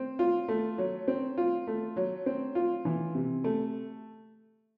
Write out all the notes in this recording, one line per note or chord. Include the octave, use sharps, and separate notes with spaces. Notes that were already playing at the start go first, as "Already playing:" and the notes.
Already playing: C4
F4
A3
F#3
C4
F4
A3
F#3
C4
F4
E3
C3
A3